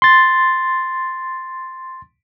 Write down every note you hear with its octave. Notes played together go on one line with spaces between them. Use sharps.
C6 A6